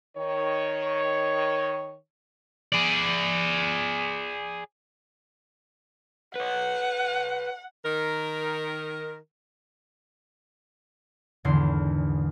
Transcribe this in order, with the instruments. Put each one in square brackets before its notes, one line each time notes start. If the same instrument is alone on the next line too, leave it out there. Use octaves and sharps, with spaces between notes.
[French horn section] D#3 C#5
[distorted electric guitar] G#4 D5
[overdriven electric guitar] B4 C#5 [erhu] F#5
[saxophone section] D#3 A#4
[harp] G#1 E2 D3 C6